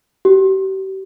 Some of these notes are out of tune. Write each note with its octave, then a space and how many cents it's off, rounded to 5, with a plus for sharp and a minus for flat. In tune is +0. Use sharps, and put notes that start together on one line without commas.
G4 -40